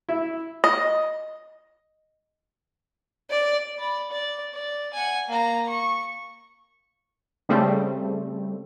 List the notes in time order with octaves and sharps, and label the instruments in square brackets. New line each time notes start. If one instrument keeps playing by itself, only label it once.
[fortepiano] E4
[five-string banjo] D#5
[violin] D5
[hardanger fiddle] D5 B5
D5
D5
F#5 G#5
A#3 A#5
C#6
[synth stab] C#3 G3 A3 C4